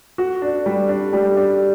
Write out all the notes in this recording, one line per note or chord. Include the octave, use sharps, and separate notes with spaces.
F#4
D4
G3
D4
G3
D4